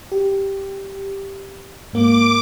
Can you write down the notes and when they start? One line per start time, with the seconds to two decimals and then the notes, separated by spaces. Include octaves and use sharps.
0.12 G4
1.93 G#2 A#3 D6